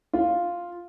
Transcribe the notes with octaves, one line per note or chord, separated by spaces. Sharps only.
F4